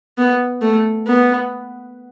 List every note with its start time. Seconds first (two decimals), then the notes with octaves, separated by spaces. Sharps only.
0.18 B3
0.62 A3
1.07 B3